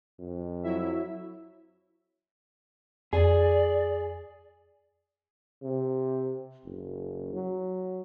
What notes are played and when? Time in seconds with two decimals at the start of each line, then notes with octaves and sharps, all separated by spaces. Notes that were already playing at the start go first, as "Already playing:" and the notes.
0.19 F2
0.63 F#3 E4 E5
3.13 F2 G#4 D5
5.62 C3
6.65 F#1
7.33 F#3